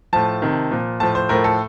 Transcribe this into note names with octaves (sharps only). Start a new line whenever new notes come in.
A2 F3 A5
C3 D#3
A#2 F3
A2 F3 A5
C5
A2 F3 A#4
A4